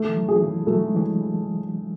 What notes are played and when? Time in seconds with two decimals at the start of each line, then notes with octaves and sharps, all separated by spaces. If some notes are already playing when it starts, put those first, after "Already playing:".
Already playing: A3
0.09 E3
0.17 F#3
0.28 G#4
0.42 E3
0.67 F#3 A3
0.86 G#3
0.97 E3